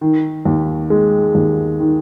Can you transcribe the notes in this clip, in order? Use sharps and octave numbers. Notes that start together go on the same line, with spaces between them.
D#3
D#2
G#3
D#2
D#3